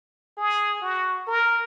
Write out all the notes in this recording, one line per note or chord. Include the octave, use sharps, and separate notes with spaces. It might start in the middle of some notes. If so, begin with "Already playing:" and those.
G#4
F#4
A#4